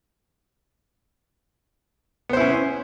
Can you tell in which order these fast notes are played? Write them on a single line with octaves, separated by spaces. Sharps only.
B3 C5 E4 C#4